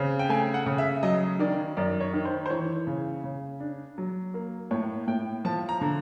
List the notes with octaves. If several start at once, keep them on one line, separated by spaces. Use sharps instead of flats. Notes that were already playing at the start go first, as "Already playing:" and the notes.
Already playing: C#3 C4
G5
A3 G#5
F#5
C#3
E5
F#3 D#5
D#3 D5
F#2 D5
C#5
D#3
C5
C5
E3 C#5
C#3
C#3
D4
F#3
A#3
A2 C#5
A2 G5
F3 A5
A#5
D3